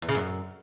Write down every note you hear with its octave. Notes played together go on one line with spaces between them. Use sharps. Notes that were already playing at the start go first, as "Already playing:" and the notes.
E2
C#3
F#2